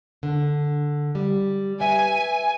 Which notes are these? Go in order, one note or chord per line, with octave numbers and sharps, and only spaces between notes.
D3
G3
B4 E5 G#5